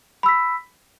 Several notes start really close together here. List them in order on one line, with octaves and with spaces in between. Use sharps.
B5 E6 B6